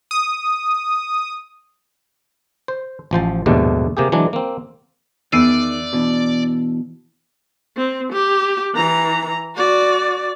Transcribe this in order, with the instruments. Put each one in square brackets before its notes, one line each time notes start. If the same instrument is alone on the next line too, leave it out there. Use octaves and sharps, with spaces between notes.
[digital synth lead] D#6
[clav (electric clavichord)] C5
A1 F3 C5 A5
A#1 D#2 G#2 B2 G3 A3
C3 A#3 G4 G#4
E3 F#3 G#3 D4
A#3 C4
[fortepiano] E2 [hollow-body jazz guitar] D#3 [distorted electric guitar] D5 [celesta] E6 C7 D#7
[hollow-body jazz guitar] B2 E3 D4
[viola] C4
G4
E3 A#5
F#4 D5